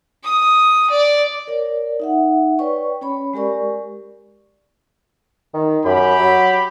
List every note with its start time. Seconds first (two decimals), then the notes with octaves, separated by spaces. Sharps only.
0.24 D#6
0.90 D5
1.47 A#4 C#5 D5
2.00 D#4 E5 F#5
2.59 B4 C#5 D5 G5 C#6
3.01 C#4 C#5 B5
3.34 G#3 G4 A#4 D5 C#6
5.54 D#3
5.85 F#2 G4 B5
6.20 F#3